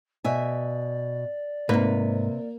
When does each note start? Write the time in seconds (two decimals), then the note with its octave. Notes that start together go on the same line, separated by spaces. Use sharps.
0.24 B2 D5 E5 G#5
1.69 G#2 C3 A#3 B4